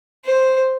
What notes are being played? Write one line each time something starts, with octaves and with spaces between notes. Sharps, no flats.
C5